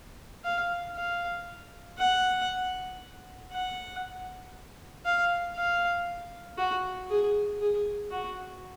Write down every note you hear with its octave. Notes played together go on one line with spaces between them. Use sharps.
F5
F5
F#5
F#5
F5
F5
F#4
G#4
G#4
F#4